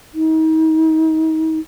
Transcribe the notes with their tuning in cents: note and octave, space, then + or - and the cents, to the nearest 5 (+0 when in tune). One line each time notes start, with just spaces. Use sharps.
D#4 +35